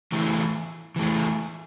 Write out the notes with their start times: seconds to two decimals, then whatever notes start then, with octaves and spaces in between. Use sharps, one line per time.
0.12 E3 A3 E4 G#4
0.96 E3 A3 E4 G#4